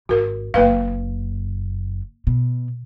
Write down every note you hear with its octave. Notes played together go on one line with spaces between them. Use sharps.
G#1 F#4 A#4
F#1 F#2 A#3 B4 F5
B2